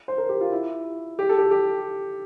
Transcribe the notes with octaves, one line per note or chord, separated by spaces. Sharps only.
C5
A#4
G4
F4
E4
G4
A4
G4
G4